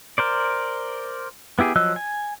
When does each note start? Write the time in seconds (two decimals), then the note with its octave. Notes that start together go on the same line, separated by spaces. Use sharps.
0.18 A#4 C5 D5
1.59 B3 E4 G4 G#4
1.76 F3 F#3 D#5 E6 F#6
1.96 G#5